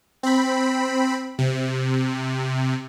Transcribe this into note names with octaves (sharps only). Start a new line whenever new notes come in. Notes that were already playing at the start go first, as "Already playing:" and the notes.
C4 B5
C3